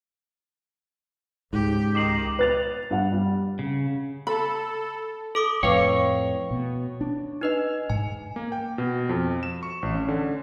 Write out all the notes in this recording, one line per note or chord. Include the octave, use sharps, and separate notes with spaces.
C#2 G#2 G4
D#3 D6 C7 F#7
B4 A6 F7
G2 F#5
G3
C#3
A4 B5
A4 D6 D#6
F2 A2 B4 C#5 F5 G5
B2
D4
D#4 B4 D#5
G#2 G#5
A#3
G5
B2
F2
E7
C#6
A1
C#4
D3